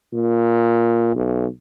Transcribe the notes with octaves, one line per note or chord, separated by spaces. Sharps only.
A#2
B1